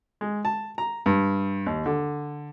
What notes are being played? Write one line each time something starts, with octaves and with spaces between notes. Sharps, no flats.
G#3
A5
A#5
G2
D#2
D3